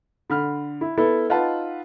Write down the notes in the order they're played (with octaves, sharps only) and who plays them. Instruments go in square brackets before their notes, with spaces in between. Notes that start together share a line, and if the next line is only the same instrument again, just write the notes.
[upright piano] D3 B5 F6
E4
B3 E4 A4
D#4 F4 B4 D#5 F#5 A5